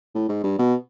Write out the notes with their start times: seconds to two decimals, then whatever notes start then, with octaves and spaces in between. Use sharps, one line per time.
0.15 A2
0.29 G#2
0.44 G2
0.59 B2